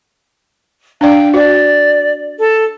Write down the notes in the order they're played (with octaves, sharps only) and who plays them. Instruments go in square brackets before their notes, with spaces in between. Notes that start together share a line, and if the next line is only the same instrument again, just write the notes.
[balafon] D4 D5 [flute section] F5 G5
[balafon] F#4 [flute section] D5
[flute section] A4 A5